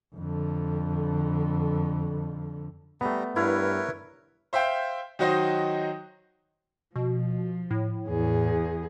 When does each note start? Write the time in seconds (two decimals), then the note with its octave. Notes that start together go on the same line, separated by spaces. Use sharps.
0.15 F2 D3
3.01 G3 A3 B3 A#5
3.36 G2 E4 A#4 B4 C#5 F5
4.53 C5 E5 F5 G5
5.19 D#3 F#3 D#4 F#4 C5 D#5
6.96 B2 F3
7.71 A2
8.09 E2 G#4